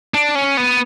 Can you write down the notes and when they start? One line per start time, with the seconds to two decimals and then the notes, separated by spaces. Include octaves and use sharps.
0.14 D4
0.35 C#4
0.57 B3